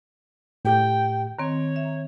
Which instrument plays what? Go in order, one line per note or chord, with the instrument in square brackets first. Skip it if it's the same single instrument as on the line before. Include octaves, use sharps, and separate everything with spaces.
[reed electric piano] A2 G4 G6 [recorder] G5
[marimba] D#3 C4 [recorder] C#5 [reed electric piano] A#5
[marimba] E5